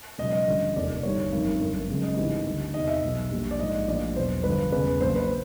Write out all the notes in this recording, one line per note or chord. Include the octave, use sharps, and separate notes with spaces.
C#2 B2 F#3 D#5
D#5
A1 G2 D3 F3
F1 D#2 D#3 D5
G1 G2 D#3 G3 C#5
G#1 F#2 D#3
G1 F#2 D3
C#2 C#3 F#3
D#5
G#1 G#2 E3 G3
D2 D3 G3
E2 C3 D#3 D#5
E5
B1 B2 F#3
A#1 A#2 G3
D5
A#1 G#2 F3 D#5
A#1 A2 F3 D5
E2 B2 F#3 C5
G1 G2 D3 F3 B4
E1 E2 C#3 B4
A#1 A#2 F#3 C5
B4